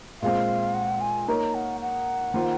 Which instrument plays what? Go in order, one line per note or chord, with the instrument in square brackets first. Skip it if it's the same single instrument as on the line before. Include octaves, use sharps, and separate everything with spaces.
[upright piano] A#2 G#3 C4 [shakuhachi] F5
[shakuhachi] F#5
G#5
[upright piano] A#3 D#4 A#4 C#5 [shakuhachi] A#5
[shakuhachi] F#5
F#5
[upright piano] D#3 A#3 F4 C5